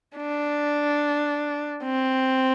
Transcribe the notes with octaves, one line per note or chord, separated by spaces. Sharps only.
D4
C4